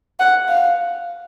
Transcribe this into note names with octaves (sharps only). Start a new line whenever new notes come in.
F#5
F5